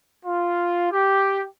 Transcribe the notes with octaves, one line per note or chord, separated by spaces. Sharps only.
F4
G4